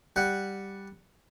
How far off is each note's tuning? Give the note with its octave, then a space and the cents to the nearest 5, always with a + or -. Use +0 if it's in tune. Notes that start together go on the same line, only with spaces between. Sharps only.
G3 +0 F#5 +0